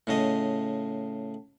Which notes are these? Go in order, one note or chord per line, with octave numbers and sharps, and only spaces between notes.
A2 C#3 D#5